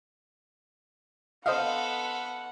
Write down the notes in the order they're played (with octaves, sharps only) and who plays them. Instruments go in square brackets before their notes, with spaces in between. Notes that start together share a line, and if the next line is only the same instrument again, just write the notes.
[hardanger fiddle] B3 A4 [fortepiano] C5 D#5 F5 [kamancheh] F#5